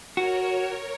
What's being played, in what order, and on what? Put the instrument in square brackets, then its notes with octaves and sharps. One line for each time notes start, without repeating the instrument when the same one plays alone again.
[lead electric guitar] F#4 [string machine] A#4 C#5
[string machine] A#4 C#5